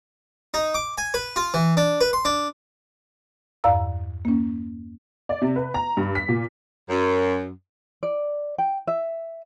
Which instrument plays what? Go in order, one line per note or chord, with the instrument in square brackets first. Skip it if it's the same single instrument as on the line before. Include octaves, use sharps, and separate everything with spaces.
[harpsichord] D#4
D6
G#5
B4
F4
E3
D4
B4
C6
D4
[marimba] E2 G2 D5 F5 A#5 E6
A#3 C#4
[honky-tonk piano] D5
C3
B4
A#5
G2
B6
A#2
[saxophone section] F#2
[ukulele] D5
G5
E5